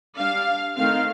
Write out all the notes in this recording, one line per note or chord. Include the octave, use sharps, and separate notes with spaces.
G3 D4 F5
D#3 A3 C4 F5